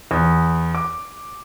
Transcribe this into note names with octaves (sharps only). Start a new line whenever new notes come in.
E2
D6